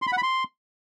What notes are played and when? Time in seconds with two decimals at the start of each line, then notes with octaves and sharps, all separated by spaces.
0.02 C6
0.07 B5
0.12 F#5
0.18 B5
0.23 C6